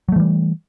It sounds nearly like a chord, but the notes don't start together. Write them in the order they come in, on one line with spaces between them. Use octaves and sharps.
F#3 A3 E3 G3